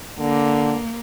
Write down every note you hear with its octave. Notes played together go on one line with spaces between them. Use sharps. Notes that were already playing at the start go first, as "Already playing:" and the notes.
D3 A#3